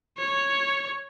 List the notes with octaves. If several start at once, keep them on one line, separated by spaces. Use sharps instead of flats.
C#5